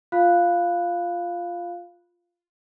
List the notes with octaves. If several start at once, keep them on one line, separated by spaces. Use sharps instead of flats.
F4 F5 B5 F#6